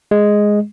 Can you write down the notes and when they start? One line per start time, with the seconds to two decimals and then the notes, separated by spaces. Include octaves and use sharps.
0.11 G#3